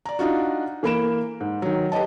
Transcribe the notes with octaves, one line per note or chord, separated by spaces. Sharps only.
D5 A#5
D4 D#4 F4 F#4
E3 A#3 A#4 B5 D7 E7
G#2
D#3 F#3
G4 B4 C#5 D#5 A5